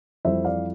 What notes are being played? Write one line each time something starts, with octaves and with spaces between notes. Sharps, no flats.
F2 E3 G3 C5 E5
D5 F5